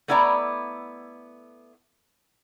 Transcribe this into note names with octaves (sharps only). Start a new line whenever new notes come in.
A3 B3 E4 D5 G5 A#5